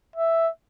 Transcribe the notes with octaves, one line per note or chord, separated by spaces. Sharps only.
E5